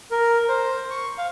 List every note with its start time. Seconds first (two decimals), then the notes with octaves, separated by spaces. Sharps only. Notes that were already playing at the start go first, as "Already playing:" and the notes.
0.11 A#4
0.48 C5
0.90 C#6
1.18 F5